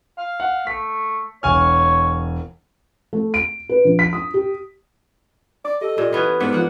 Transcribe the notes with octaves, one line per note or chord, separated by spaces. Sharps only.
F5
F#5
A3 B6
E1 C#5 G#5 F6
A3
D7
B4
A#1
B6
D#6
G4
D5 D6
G4 A4 D#5
A#2 G4 A4 D5
E3 B3 C#4 B4
G#2 B3 D4
F3 A#3 F#5